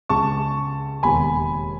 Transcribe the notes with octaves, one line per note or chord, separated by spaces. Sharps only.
C#2 C#3 G#3 A5 C#6
E1 D#2 D#3 G#5 B5